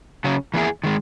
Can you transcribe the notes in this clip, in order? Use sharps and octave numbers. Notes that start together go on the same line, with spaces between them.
C#3 F#3 C#4
E3 A#3 E4 G#4
D#3 G#3